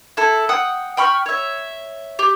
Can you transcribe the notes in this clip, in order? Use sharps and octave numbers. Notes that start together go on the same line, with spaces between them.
E4 A4
F#5 G5 D#6
G5 B5 C#6 F6
C#5 E5
G4